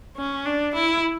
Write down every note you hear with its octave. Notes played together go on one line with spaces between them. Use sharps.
C#4
D4
E4